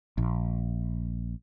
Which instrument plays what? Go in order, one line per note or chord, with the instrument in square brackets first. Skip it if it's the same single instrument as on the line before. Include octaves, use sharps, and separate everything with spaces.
[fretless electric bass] A#1